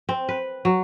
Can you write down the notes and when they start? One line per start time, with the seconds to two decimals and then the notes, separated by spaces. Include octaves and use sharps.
0.09 C4
0.29 B4
0.65 F#3